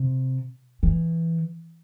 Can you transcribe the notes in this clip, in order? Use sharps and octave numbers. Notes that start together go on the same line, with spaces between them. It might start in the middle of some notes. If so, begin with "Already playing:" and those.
Already playing: C3
E3